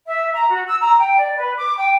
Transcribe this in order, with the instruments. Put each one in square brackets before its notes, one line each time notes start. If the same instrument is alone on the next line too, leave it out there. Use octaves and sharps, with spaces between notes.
[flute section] E5
A#5
F#4
E6
A#5
G5
D5
B4
D6
G5